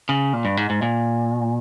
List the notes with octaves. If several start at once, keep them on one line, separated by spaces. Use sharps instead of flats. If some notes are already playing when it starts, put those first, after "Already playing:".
C#3
A#2
G2
G#2
G#2
A#2